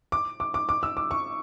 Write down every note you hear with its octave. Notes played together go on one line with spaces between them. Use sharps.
D6
D6
D6
D6
E6
D6
C#6